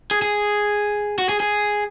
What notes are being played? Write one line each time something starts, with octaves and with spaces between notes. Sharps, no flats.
G#4
G#4
F#4
G#4
G#4